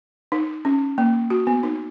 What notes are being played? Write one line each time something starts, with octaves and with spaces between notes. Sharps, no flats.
D#4
C#4
A#3
F#4
B3
D#4